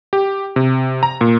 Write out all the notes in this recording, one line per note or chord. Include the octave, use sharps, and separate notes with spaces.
G4
C3
A#5
A#2